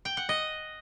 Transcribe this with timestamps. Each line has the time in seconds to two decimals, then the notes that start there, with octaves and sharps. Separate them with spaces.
0.05 G5
0.17 F#5
0.29 D#5